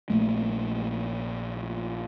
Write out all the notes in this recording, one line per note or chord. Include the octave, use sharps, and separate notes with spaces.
A#1 A3 A#3